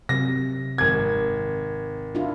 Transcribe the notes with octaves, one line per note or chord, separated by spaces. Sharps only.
C3 F#3 A#6
G#1 G#6
D4 E4 F4